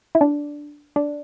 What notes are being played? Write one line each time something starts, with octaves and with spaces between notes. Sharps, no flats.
E4
D4
D4